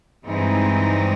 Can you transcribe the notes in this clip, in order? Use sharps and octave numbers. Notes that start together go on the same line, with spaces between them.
G2 E3 G#3 C4 D#4